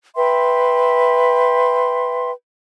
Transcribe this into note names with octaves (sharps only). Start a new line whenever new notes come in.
B4 E5 G5 C6